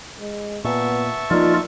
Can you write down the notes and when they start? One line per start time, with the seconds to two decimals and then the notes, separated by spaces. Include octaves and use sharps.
0.20 G#3
0.65 A#2 B3 E5 A5 C#6
1.31 F3 A#3 D#4 F4 A#4 D5